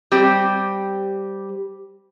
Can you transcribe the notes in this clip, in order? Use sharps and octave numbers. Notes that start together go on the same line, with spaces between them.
G3 C4 G4